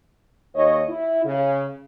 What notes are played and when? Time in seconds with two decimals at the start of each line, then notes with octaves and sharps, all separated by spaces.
0.55 D#2 C#5 D#5
0.89 E4
1.25 C#3